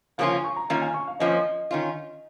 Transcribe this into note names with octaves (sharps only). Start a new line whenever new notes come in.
C#3 F3 A#3 C#4 F4 F5
G#5
C#6
A#5
D#3 A#3 C#4 F4 A#5
G#5
C#6
F5
F2 F3 A#3 C#4 D#5
D#3 C#4 F4